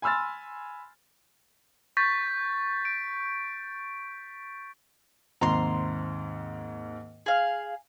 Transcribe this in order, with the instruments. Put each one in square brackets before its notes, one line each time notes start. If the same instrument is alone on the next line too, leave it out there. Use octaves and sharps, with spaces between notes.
[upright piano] G#5 B5 C6 E6 F6 A6
[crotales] C#6 G6 A6 B6
D7
[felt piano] D#2 G#2 C3 [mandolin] A#5 C6
[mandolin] G#4 F5